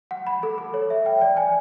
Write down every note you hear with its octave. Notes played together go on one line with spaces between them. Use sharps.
F#5
B5
A4
A4
C#5
E5
G5
D5
G#5